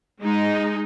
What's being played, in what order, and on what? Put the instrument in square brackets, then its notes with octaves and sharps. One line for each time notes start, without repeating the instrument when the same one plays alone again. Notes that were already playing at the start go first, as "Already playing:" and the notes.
[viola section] G#3 D#4